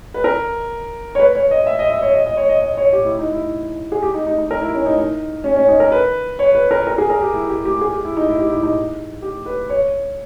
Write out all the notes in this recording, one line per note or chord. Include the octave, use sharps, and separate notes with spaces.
B4
A#4
C#5
B4
C#5
D#5
E5
D#5
E5
C#5
D#5
D#5
C#5
D#5
D#5
C#5
G4
E4
D#4
E4
G#4
G4
D#4
D#4
D#4
A#4
E4
C#4
D#4
D#4
C#4
C#4
D#4
A#4
B4
C#5
B4
A#4
A#4
G#4
A#4
G4
E4
G4
G4
G#4
G4
E4
D#4
E4
G4
E4
D#4
D#4
G4
B4
C#5